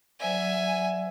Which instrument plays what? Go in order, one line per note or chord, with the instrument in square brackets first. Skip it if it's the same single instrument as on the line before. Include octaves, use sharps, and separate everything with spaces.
[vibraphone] F#3 C5 D5 [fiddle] E5 G#5